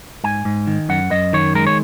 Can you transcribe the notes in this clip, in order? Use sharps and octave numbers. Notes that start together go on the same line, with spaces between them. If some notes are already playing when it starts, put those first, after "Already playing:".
G#2 G#5
G#2
D#3
F#2 F#5
F#2 D#5
D#3 C#5
G#3 A#4
C#5